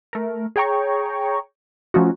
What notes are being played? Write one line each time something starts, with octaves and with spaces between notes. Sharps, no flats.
A3 A#4
G#4 C#5 G5 A#5 C#6
F3 A3 C#4 D#4 F4 F#4